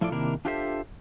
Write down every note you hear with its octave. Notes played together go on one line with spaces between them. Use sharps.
A2 F3 E4 F4 A4 D5
C3 D#3 A#3 D4 E4 A#4
D4 F4 G4 A4 C5 E5